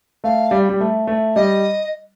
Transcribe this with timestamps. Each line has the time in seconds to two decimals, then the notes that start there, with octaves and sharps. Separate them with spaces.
0.24 A3 F5
0.51 G3
0.69 G3
0.80 A3
1.07 A3
1.35 G3 D#5